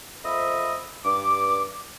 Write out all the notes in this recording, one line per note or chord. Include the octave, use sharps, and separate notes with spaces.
F2 A#3 C5 D#5 E5 B5
G2 D6